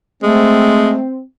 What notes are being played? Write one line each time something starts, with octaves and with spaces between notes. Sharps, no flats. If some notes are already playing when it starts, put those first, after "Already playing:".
G#3 A3 C4